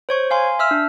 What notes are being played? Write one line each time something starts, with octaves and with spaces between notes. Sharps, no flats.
C5 C#5 C#6
F5 G#5 C6
E5 E6 F6
D4